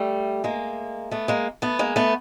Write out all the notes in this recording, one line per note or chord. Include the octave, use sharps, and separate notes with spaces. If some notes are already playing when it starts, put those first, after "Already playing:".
Already playing: G3 A3
G#3 A#3
A3 B3
G#3 A#3
A3 B3
G#3 A#3
A3 B3